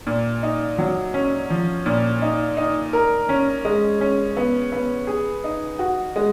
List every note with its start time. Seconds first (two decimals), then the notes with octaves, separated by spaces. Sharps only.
0.07 A#2
0.43 D#4
0.78 F#3
1.14 C#4
1.50 F3
1.86 A#2
2.22 D#4
2.57 D#4
2.93 A#4
3.29 C#4
3.65 G#3
4.01 C#4
4.37 B3
4.72 B3
5.07 G#4
5.44 D#4
5.79 F#4
6.16 G#3